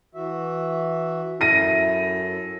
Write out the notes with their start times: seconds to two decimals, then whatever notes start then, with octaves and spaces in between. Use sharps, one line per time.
0.15 E3 F#4 E5
1.41 F#2 E4 A4 A#6 D#7